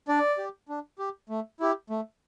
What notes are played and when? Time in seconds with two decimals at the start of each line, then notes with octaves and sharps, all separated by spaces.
0.08 D4 D5
0.38 G4
0.69 D4
0.99 G4
1.29 A3
1.60 E4 G4
1.90 A3